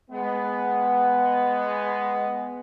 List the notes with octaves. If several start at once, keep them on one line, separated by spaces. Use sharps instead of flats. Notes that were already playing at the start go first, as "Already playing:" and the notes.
G#3 B3